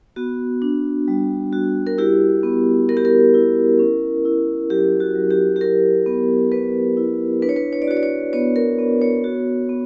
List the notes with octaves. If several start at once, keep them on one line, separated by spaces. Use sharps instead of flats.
B3 F#4
D4
G3
F#4
A#4
E4 G4
B3
B3 A#4
G4
A#4
E4
C#4
E4
F#3 G4
F#4
F#3
G4
G4
E4 A#4
B3
B3 B4
E4
D4 B4
C#5
B4
C#5
D5
F#4 C#5
D5
C#5
B3 C#5
A#4
B3
C#5
F#4
B3